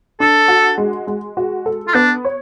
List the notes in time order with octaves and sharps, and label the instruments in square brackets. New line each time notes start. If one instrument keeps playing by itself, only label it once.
[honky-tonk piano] D4 [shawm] A4
[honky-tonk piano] F#4
G#3
G#3
F#4
A4
[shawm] F4
[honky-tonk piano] B3 [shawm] D4
[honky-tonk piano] C#5